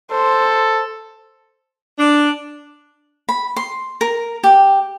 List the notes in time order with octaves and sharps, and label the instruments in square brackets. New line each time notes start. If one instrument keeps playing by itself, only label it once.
[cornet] A4 [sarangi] C5
[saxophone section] D4
[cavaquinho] B5
C6
A#4
G4